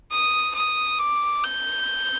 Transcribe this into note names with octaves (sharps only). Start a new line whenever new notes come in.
D#6
D#6
D6
G6